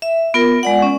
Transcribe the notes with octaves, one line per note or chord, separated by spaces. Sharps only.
E5
B3 F4 A#4
G#3 D5 F#5
C#4